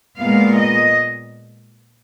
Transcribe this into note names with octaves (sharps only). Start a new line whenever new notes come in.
A#2 G#3 B3 F5
D#5